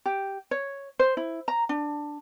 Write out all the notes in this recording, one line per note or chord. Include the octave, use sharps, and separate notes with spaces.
G4
C#5
C5
E4
A#5
D4